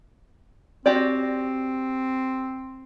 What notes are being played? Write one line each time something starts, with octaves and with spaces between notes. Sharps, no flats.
C4 F#4 G4 D5